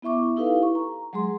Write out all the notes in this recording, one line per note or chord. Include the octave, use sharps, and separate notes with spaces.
B3 E4 E5 C#6 D6
D#4 E4 G4 A4 B4 F5
C#6
A#5
F#3 G#3 G#4 C6